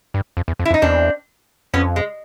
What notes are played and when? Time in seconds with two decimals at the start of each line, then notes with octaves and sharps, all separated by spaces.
0.14 G2
0.37 F2
0.48 E2
0.59 F2
0.65 E4
0.71 F2
0.74 D#4
0.82 E2 C4 D4
1.74 F2 B3 C#4
1.96 G#3